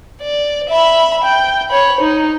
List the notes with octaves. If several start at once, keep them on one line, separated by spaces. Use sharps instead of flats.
D5
E5 B5
G5
C#5 B5
D#4